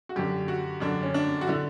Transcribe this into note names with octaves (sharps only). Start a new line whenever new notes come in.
F#4
F#2 D3 G4
F#4
F#2 D3 D4
C#4
D4
F#4
D3 E4